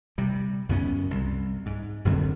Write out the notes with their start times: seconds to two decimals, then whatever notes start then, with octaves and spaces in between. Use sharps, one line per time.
0.18 C3 G3
0.69 C#2 F#2 B3 C#4
1.11 C2
1.66 G#2
2.05 F#1 F#2 D3 C4